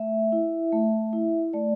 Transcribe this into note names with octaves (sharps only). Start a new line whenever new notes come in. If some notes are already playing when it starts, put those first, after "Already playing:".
Already playing: A3 E5
E4
A3
E4
A3 D5